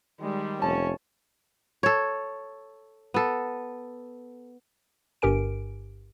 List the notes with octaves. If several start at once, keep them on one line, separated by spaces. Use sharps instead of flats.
D#3 G3 G#3
F1 C#4 A5
A4 C#5
B3 A4
G1 G2 G4 A#4 G#5 D7